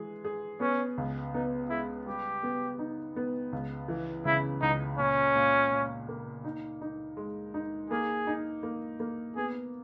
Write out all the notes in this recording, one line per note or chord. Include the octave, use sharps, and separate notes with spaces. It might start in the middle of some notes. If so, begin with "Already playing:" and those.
Already playing: E3 G#3 G#4
G#4
B3 C#4
C#2
B3 D#4
G#3 E4
G3 G4
B3
D#4
B3
C#2
E3
C#3 E4
C#2 D#4
A#2 C#4
A#2
A#2
A#3
D#4
D#4
G#3
D#4
A#3 G#4
D#4
A#3
A#3
B3 G#4